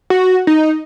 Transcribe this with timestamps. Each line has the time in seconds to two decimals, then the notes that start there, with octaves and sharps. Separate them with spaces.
0.10 F#4
0.47 D#4